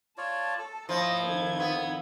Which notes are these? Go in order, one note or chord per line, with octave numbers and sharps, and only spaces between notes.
F4 C#5 D5 A5
A4
F3 E4 C#5 D#5 A#6
F2 D#3 G#6
B3